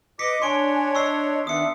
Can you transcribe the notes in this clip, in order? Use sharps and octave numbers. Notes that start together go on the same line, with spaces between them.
B4 D#5 D6 B6 C#7
D4 C#5 G#5 C6 C#6 D7
D#5 C#6 E6 C7
D#3 B3 D4 E5 D#6 C#7